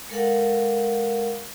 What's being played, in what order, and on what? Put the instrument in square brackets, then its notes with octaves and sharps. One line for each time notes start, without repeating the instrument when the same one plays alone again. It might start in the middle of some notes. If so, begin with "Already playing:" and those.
[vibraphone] G#3 A4 A#4 F5 F#5